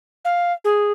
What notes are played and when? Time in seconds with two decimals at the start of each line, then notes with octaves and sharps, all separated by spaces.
0.25 F5
0.65 G#4